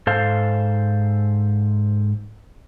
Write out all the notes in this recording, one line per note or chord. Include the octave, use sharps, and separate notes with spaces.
G#2 A4 C5 F5